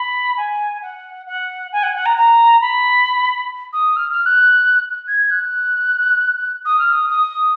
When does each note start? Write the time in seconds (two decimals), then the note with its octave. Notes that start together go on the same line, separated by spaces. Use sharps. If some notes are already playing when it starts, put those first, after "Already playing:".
Already playing: B5
0.37 G#5
0.82 F#5
1.26 F#5
1.72 G#5
1.83 F#5
1.94 F#5
2.05 A#5
2.16 A#5
2.61 B5
3.73 D#6
3.96 F6
4.11 F6
4.25 F#6
5.07 G#6
5.30 F#6
6.65 D#6
6.78 F6
6.92 D#6
7.09 D#6